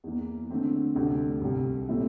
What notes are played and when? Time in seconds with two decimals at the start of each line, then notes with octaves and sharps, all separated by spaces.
0.04 E2 E3 A#3
0.50 D3 A3 C4
0.96 D2 C3 G3 D4
1.42 C2 C3 G3
1.89 A#2 A3 C4 E4